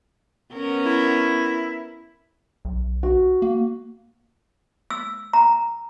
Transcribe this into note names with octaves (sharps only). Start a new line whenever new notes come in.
B3 C#4 A#4
E4
B1
F#4
A#3
E6
A#5